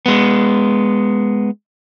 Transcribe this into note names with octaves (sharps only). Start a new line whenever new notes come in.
G#3 B3